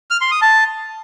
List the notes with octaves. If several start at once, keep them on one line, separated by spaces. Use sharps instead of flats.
F6
C6
D#6
A5